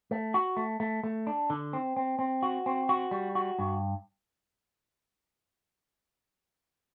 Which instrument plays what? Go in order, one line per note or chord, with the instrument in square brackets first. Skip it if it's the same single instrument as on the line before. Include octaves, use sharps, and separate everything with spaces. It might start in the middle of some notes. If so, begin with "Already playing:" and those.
[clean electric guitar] A3
F#4
A3
A3
A3
D4
D3
C4
C4
C4
F#4
C4
F#4
G3
F#4
G2